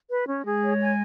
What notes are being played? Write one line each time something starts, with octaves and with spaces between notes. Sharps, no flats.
B4
C#4
G#3 G#4
C#5
G#5